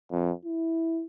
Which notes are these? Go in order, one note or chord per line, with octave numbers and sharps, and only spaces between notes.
F2
E4